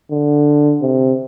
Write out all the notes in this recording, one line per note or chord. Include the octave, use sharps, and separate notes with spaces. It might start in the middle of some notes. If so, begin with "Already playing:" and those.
D3
C3